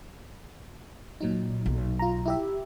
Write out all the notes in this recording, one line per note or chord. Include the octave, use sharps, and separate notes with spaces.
A#2 F#3 D#4
B1
F4 A#5
E4 G4 E5